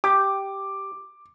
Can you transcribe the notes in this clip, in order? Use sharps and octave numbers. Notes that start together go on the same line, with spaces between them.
G4 D6